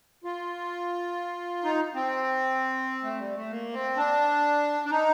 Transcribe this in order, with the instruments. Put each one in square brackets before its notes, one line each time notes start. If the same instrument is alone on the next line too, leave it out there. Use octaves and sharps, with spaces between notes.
[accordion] F4
D#4
C4
A3
G3
A3
A#3
C4
D4
D4
D#4